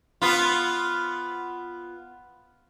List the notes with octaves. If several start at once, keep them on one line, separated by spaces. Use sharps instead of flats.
B3 F4